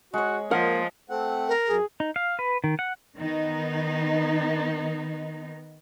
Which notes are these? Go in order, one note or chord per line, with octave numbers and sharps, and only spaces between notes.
G#3 F#4 C#5
F3 A#3 F4 A#4 C5 D#5 F#5
A3 C4 F#5
A#4
F#2 G#4
D#4
F5
B4
D#3
F#5
D#3 B3 D#4